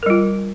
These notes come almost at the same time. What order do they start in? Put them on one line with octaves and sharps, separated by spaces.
A#4 G3 F4